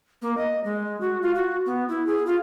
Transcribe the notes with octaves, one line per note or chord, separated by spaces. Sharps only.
A#3
D#5
G#3
F#4
F4
F#4
B3
E4
G#4
F4